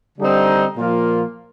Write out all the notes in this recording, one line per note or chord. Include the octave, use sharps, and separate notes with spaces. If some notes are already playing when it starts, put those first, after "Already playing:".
D3 G3 C4 D#4
A#2 F3 A#3 F4